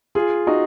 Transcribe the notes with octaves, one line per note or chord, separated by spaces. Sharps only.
F4 G#4
D#4 F#4